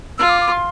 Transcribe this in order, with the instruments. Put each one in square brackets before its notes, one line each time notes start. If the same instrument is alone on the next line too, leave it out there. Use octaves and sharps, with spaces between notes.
[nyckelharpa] F4 [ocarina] E6
[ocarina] D6
D6
C6